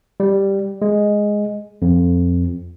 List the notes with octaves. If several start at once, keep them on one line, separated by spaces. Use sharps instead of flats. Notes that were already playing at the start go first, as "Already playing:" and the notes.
G3
G#3
F2